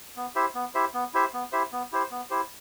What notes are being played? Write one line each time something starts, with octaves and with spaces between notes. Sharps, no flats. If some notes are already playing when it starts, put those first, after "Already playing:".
B3
E4 G4 C5 E5
B3
E4 G4 C5 E5
B3
E4 G4 C5 E5
B3
E4 G4 C5 E5
B3
E4 G4 C5
B3
E4 G4 C5